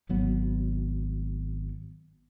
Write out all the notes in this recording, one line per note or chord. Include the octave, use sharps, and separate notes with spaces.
G#1 F#3 B3